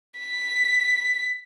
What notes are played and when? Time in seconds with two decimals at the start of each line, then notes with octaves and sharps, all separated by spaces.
0.20 B6